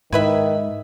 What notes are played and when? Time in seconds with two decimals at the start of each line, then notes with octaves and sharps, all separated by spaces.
0.13 G#2 D#3 E4 B4 E5